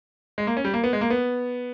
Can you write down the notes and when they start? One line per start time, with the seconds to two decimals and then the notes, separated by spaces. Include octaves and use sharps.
0.38 G#3
0.47 A#3
0.57 C#4
0.65 G3
0.74 A#3
0.84 B3
0.93 G#3
1.01 A#3
1.10 B3